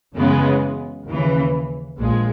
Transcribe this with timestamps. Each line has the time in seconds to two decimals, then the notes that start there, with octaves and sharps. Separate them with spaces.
0.14 F#2 C#3 E3 G#3 B3
1.06 D#2 C#3 E3
1.98 A#1 A#2 G#3